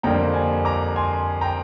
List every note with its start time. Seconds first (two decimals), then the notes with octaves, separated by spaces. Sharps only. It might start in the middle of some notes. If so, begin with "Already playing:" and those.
0.03 F2 D3 G3 A#3 G5 A#5
0.34 G#5 C6
0.65 A#5 D6
0.96 G#5 C6
1.41 G5 A#5